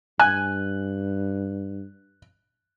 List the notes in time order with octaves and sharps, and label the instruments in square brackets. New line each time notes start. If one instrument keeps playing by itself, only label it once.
[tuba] G2 [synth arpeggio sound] G#5 [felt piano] F#6